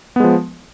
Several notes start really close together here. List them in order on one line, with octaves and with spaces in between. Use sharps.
B3 G#3 F3